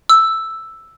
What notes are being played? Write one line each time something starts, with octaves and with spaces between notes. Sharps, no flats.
E6